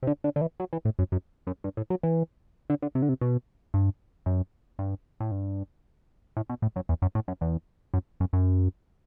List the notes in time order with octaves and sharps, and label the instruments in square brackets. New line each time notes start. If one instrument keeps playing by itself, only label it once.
[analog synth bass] C3
D3
D3
D3
E3
F#3
E3
A2
F#2
F#2
F#2
G2
A2
F#3
E3
D3
D3
C3
D3
C3
B2
G2
F#2
G2
A2
G2
A2
B2
A2
F#2
E2
F#2
A2
F#2
E2
F#2
F#2
F#2